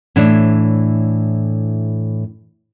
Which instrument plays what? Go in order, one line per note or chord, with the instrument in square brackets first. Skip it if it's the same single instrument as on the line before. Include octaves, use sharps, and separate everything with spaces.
[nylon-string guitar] A2 E3 D4 C#5